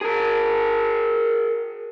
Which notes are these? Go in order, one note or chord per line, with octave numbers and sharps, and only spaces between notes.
G#4 A#4